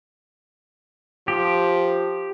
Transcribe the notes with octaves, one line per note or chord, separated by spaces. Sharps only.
F3 G4